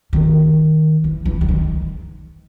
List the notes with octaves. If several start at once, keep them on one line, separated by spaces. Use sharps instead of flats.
D#3
E3
E3
E3
D#3